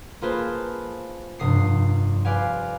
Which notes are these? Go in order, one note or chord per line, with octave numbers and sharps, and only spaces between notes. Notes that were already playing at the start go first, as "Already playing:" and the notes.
A#3 F4 G#4 B4 C5 A5
F1 G2 D#6 C7
G4 B4 D5 F5 G#5